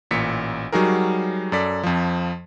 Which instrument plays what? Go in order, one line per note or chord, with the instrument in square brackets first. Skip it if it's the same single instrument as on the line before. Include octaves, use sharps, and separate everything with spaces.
[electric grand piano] A1 A#2 B6 C#7
F#3 G3 D#4 F#4 G#4 A#4
F#2 A4 D5 B6
F2 F3